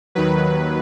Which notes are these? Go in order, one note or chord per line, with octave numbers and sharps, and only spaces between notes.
D#2 D#3 F#3 B4